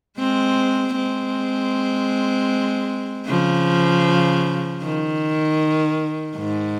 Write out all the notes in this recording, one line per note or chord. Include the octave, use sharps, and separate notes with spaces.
G#3 C4
G#3 C4
C#3 F3
D#3
G#2